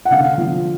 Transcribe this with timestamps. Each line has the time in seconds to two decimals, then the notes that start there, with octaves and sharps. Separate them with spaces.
0.05 F#5
0.11 D3 F5
0.38 F3